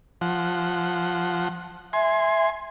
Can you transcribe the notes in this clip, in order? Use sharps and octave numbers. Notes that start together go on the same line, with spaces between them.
F3 F#5
E5 G#5 C6